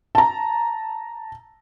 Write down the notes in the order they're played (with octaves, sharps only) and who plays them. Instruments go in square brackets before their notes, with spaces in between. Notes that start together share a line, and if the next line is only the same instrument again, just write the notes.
[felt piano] A5 A#5